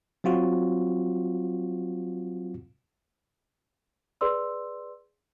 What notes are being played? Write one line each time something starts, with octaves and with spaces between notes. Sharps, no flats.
F#3 C4 F4 F#4
G#4 B4 D5 C6 E6